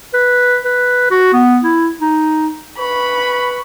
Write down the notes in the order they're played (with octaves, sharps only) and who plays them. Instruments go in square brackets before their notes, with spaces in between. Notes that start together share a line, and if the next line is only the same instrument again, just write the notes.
[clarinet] B4
B4
F#4
B3
E4
D#4
[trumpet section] B4 C#6 [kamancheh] B5